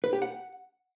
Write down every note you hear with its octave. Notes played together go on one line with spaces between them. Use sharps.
B4
G4
F#5